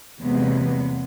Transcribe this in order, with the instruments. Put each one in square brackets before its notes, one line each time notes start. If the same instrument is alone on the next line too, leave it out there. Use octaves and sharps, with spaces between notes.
[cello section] E2 C3 F#3 G#3 A#3 B3